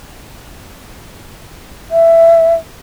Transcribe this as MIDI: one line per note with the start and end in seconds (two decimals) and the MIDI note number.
1.91 2.54 76